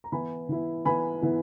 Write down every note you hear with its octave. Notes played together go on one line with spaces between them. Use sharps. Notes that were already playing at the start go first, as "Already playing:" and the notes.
A#5
E3 B3 E4 G#5 B5
E3 B3 E4
E3 B3 E4 G#5 B5
E3 B3 E4